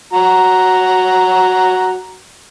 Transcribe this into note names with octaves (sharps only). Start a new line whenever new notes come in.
F#4 A#5